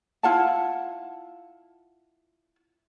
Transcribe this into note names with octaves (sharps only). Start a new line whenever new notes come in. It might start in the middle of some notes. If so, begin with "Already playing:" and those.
E4 F4 F#5 A5